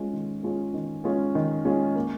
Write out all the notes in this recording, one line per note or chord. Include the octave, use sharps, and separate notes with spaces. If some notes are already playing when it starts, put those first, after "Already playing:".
Already playing: G#3 C#4 F4 G#4
D#3
G#3 C#4 F4 G#4
D#3
G#3 C#4 F4 G#4
D#3
G#3 C#4 F4 G#4
A#3